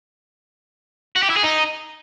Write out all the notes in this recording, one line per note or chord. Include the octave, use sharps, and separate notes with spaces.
F#4
G4
E4
G#4
D#4